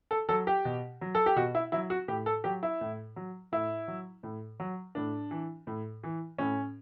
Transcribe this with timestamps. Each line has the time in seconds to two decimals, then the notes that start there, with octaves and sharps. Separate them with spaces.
0.11 A4
0.29 F#3 A4
0.47 G4
0.65 B2
1.01 F#3
1.15 A4
1.26 G4
1.36 B2 F#4
1.55 E4
1.72 F#3 E4
1.90 F#4
2.08 A2 G4
2.26 A4
2.44 F#3 G4
2.63 E4
2.81 A2
3.16 F#3
3.52 A2 E4
3.88 F#3
4.23 A2
4.60 F#3
4.95 A2 D4
5.31 E3
5.67 A2
6.03 E3
6.38 A2 C#4